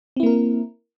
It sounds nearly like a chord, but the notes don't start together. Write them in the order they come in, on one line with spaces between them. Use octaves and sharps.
C4 E4 A#3 A#4